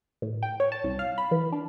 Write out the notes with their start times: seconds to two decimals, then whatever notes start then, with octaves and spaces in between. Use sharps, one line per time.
0.22 A2
0.43 G5
0.60 C#5
0.72 A5
0.84 C2
0.99 F5
1.18 B5
1.31 E3
1.52 D4